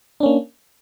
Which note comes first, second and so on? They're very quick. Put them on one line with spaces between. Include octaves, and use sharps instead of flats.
D4 C#4 A#3